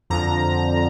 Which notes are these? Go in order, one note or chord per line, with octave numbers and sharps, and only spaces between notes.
F2 D3 F3 A#5